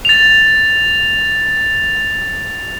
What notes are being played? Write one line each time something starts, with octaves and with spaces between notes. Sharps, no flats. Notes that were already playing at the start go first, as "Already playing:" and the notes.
A6 F7